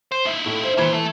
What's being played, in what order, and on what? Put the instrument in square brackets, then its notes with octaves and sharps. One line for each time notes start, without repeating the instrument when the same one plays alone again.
[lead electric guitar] C5
D#4 E4
[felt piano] A2
C5
[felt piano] E3 B5 G#6 [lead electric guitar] A#3 C5
[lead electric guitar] A4 E5